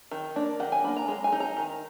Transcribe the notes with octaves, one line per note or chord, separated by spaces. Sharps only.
D#3
A#3 D4
D#3 F#5
G#5
A#3 D4 B5
A#5
G#3 A#5
G#5
D#4
A#5
D#3